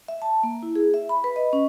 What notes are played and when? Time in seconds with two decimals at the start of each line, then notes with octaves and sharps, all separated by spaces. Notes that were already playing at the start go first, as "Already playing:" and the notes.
0.08 E5
0.22 A5
0.43 A#3
0.63 E4
0.75 G#4
0.94 E5
1.09 B5
1.24 B4
1.36 D#5
1.53 C#4